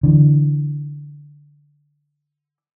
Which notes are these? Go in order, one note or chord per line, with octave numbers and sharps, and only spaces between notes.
D3 E3